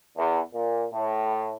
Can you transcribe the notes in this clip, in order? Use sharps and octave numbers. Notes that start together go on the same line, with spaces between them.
E2
A#2
A2